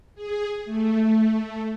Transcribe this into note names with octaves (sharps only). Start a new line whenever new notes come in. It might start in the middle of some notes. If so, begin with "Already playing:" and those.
G#4
A3